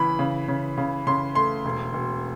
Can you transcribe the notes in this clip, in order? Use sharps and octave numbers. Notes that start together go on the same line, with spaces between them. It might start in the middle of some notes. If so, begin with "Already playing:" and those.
Already playing: C#3 E3 B5
C#3
C#3
C#3
C#3 C6
A3 C6
E1
E1